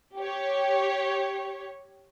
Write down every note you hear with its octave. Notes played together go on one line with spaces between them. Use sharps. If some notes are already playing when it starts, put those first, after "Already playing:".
G4 C#5